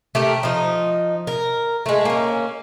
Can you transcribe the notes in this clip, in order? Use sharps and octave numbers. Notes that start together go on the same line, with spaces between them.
A3 G4 A#4
F3 D#4
A#4
G#3 A3
A#3 C#4